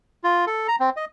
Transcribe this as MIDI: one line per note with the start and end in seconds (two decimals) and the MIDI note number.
0.24 0.45 65
0.47 0.67 69
0.68 0.76 82
0.80 0.90 60
0.96 1.05 75